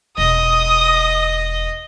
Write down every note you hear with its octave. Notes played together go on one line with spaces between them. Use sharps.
E1 D#5 D#6